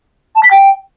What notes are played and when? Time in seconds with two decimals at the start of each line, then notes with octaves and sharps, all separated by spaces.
0.35 A5
0.43 B6
0.51 G5